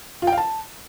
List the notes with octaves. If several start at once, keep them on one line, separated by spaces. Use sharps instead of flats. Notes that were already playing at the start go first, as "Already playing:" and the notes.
F4
G5
F5
A5